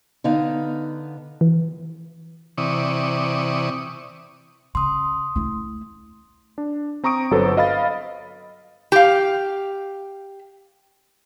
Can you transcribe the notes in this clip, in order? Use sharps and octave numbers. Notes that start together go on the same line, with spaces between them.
D3 B3 D#4 F5
E3
C3 E3 D5 C#6 D#6
C#3 C6 D#6
A3 E4
D4
C4 A#5 C#6 D#6 D7
G1 F#3 A4 B4 C5
D#5 F5 B5 A6
G4 F5